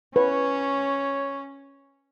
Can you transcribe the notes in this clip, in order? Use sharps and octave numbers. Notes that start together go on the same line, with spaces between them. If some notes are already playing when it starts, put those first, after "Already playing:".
C#4 B4 C#5